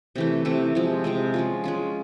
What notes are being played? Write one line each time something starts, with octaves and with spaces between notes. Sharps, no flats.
C3 E3 A3
C3 E3 A3
C3 F3 G#3
C3 F3 G#3
G#3 C#4 F4
G#3 C#4 F4